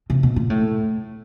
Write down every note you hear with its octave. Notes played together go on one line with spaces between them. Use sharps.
C3
B2
A#2
A2